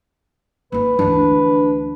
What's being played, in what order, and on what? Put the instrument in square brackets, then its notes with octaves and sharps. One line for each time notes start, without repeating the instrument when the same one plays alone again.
[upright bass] A#3 D#4 [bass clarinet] B4
[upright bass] D2 E3 [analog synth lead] D4